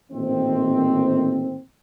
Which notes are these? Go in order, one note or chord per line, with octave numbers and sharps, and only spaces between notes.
A1 A#2 D#3 C4